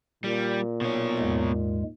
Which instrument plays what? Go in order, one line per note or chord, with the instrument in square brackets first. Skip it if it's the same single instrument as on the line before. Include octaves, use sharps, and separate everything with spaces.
[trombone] A#2 [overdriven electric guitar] G3
[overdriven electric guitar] B2 C#5
[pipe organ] D#2 G#2 G#3